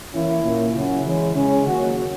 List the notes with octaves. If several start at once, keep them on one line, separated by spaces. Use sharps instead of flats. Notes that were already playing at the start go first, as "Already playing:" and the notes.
E3 A#3 C#4 E4
A#2 A#3 C#4
C#3 F#3 C#4 E4
E3 G#3 C#4
C#3 G#3 C#4
D#3 F#3 A#3 C#4 F#4